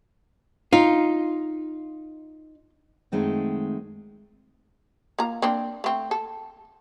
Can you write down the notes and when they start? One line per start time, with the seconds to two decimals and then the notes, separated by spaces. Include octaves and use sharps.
0.73 D#4 F4
3.12 F#2 D#3 G#3 A3 C4 D#4
5.19 A#3 F4 A#5
5.42 A#3 C4 D4
5.84 A3 C4
6.11 A4